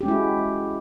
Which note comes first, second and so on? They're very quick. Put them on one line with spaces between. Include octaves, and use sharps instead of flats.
G4 C#4 G#3 E4 F#4